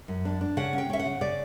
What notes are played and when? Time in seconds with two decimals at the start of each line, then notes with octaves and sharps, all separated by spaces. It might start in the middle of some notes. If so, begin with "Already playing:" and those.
0.08 F#2
0.25 D4
0.41 D4
0.57 C#3 F#5
0.73 C#4
0.78 G5
0.90 C#4 E5
0.99 F#5
1.05 C#3
1.21 C#3 D5